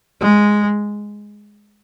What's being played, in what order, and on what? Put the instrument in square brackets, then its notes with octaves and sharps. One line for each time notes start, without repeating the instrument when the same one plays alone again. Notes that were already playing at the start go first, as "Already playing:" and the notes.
[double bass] G#3